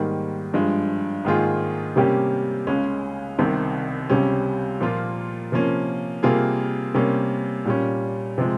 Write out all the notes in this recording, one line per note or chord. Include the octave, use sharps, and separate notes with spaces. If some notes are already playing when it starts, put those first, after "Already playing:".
Already playing: G#2 D#3 G3 A#3
G2 F3 G#3
G#2 D#3 A#3 F4 G#4
C3 G3 A#3 C#4 G4
C#2 C#3 G#3 C#4
C2 C3 D#3
C#2 C3 G3 C#4
A#2 F3 A#3 F4
C3 F3 A#3 C#4
C3 G3 A#3 F4 G#4
C3 G3 A#3 C#4
A#2 G3 C#4
C3 F3 G#3